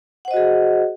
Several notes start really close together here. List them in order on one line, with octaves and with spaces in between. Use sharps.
F#5 C5 D#5 F#4 G#4